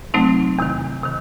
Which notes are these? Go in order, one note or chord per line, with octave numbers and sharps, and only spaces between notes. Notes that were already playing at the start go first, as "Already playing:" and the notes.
C3 F#3 A3 C4 D#4
E2 C3 D#3
C3 D#3